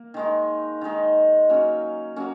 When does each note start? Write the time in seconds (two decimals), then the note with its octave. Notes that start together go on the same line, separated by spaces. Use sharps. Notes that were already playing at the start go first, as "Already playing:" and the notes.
Already playing: A#3
0.14 D#3 G#3 D#4
0.81 D#3 G#3 D#4
1.49 F#3 A#3 C#4
2.16 F#3 A#3 C#4